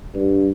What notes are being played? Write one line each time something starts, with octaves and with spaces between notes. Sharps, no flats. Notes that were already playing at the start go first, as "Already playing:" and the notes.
G2